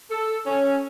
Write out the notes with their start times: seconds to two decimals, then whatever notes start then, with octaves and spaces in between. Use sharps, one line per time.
0.10 A4
0.46 C#4